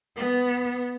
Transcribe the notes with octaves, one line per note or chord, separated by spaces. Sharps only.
B3